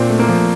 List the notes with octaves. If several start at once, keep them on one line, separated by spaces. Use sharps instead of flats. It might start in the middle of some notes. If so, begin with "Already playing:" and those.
Already playing: A#2 C4 D4
A3
A#3
F3